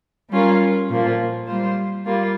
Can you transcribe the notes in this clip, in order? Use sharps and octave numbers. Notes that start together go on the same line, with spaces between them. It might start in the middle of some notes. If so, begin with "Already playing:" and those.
G3 C#4 F4 A#4
A#2 F3 A#3 F4
G3 A#3 F4 C5
G3 A#3 F4